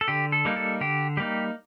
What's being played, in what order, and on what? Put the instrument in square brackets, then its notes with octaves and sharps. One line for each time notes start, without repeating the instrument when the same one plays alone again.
[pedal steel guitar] A4
D3 G4
A4
G3 A#3 D#4
A4
D3 G4
G3 A#3 D#4 G4